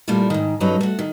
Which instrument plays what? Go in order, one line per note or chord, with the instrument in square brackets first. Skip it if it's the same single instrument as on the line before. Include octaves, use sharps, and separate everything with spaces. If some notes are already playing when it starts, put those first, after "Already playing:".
[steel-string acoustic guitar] A#2 G3 A3 A#3 E4 F4
G#2 D#3
G2 C#3 F#3 D#4 A4 B4
A3 F#4
D#3